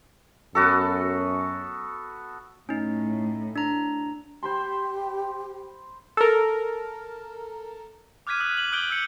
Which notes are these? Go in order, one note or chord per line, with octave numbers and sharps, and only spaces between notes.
F#2 B3 F#4 A4
A2 C#4 D#4
D4 A#5
G4 C5 B5 C6
A4 A#4
D6 F6 F#6 G#6 B6 D#7
D#6 F#6 B6
F#7
D6 D#6 F#6 G6 D7 G7
E6 G6 C#7